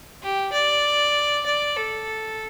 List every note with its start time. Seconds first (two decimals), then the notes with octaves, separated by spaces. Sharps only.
0.23 G4
0.53 D5
1.46 D5
1.76 A4